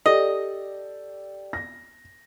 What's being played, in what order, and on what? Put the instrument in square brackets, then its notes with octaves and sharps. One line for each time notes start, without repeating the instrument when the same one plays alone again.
[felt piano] G4 A4 D5 [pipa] D#5
[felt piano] A#6